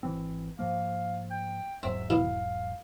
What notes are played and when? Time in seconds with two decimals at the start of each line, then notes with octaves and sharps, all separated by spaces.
0.03 G#1 E3 C4
0.59 G#2 F3 A#3 F5
1.31 G5
1.83 E1 G#2 F#3 C4 E5
2.10 B2 E3 E4 F5